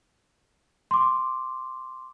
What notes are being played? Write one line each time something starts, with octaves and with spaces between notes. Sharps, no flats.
C6 D6